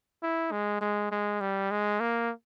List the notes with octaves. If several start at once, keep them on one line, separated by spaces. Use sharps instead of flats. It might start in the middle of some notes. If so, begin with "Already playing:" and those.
E4
G#3
G#3
G#3
G3
G#3
A#3